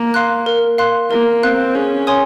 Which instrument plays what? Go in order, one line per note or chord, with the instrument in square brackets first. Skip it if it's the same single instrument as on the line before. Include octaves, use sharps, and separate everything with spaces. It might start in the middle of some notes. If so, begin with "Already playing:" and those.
Already playing: [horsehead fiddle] A#3
[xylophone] F5 C6 F#6
A#4
F5 C6 F#6
[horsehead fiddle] A#3 [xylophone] A#4
[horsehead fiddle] C4 [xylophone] F5 C6 F#6
[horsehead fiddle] C#4 [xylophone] G#4
[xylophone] C#5 G#5 C6 D#6